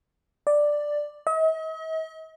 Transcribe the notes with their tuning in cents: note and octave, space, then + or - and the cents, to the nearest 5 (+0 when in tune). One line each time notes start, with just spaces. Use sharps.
D5 +5
D#5 +45